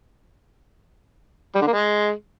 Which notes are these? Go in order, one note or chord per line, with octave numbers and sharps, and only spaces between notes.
G3
D3
A#3
G#3